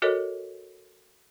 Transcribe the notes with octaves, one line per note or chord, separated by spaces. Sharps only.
F#4 A4 A#4 C#5 D#5